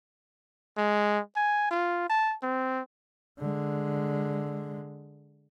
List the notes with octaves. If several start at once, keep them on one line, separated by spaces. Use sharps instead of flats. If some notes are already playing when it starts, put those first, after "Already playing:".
G#3
G#5
F4
A5
C4
D3 G#3